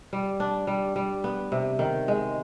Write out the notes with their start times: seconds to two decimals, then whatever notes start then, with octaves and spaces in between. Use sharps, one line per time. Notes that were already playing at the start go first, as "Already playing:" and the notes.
0.13 G3
0.40 D4
0.67 G3
0.96 G3
1.24 B3
1.52 C3
1.79 D#3
2.08 G#3